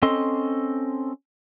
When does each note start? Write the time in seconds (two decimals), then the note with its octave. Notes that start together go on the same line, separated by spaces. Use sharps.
0.02 C4 C#4 A4 D#5 C6